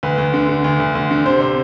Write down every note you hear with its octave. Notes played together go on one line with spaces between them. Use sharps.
D2 B4
D2
D3
D3
D2
D2
D2
D3
C3 C5
C3 C5